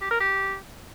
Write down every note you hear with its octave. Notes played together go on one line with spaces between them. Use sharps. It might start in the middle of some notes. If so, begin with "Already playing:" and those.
G4
A#4
G4